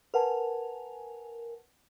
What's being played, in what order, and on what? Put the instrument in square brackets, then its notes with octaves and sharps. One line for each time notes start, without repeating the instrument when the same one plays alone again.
[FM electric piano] A#4 G#5 [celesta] B4 F#5 A5